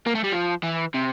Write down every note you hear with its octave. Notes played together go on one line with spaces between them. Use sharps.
A#3
A3
G3
F3
E3
C3